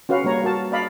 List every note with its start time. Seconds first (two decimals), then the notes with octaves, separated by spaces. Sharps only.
0.09 C#4 F#4 B4 F5
0.24 G3 A#3 C#5 A#5
0.44 F#4 A#4 A5
0.72 D5 D#5 F5 B5